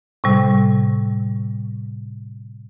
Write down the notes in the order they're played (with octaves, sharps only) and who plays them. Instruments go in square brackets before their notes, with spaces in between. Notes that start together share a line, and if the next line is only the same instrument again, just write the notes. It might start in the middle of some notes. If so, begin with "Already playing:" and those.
[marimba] A2 C3 G3